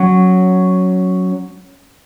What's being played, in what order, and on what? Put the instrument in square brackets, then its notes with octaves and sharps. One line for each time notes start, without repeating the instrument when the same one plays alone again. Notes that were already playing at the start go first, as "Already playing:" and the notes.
Already playing: [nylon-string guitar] F#3 C#4 C#5